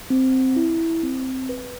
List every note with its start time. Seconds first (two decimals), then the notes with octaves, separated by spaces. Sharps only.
0.10 C4
0.56 E4
1.03 C4
1.49 B4